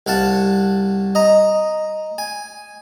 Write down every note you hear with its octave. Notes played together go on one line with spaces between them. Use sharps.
C2 F5 F#5 A5
D#5 A#5
G#5